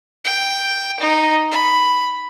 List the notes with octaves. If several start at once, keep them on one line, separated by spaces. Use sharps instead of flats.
G5
D#4
B5